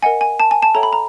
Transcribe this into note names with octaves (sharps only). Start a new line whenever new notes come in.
A#4 D#5 F#5 G#5
G#5
A5
G#5
A5
A4 C#5 E5 G5 A#5
B5
A#5